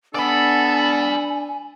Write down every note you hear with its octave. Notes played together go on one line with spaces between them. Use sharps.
B3 D4 A4 D5 G#5 B5